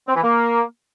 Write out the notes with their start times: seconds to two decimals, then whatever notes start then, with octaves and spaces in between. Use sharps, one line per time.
0.08 C4
0.15 E3
0.23 A#3